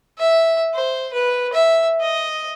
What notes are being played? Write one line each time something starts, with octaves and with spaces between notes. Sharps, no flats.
E5
C5
B4
E5
D#5